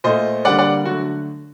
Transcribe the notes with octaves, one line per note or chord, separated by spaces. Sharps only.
A#2 A3 C5 D#5
D3 G3 A#3 D5 F#5
D5 F#5
D3 F#3 A3 F#4